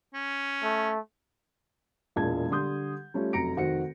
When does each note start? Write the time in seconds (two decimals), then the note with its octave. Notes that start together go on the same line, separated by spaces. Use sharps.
0.14 C#4
0.63 A3
2.16 E1 A#2 G#3 E4 A5 G#6
2.51 D3 G3 C6 D#6 G6
3.14 G3 A3 C#4 F4
3.33 F1 F#3 A#5 A#6 C#7 D7
3.56 F1 D#3 F#4 C5 C#7